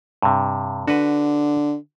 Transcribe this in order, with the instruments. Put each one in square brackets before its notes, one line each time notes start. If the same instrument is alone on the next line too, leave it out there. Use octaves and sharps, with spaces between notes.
[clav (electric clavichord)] G2 C3
[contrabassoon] D3 [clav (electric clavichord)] F#4 B4